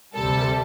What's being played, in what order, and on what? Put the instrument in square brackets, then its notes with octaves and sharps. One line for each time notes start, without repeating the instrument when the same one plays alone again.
[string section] D2 C3 G3 A4